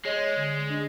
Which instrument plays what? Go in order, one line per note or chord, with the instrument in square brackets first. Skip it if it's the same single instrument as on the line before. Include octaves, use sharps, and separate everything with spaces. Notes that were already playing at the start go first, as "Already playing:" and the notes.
[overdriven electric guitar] G#3 [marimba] C#5 D#5
[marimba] D3 G#6
D4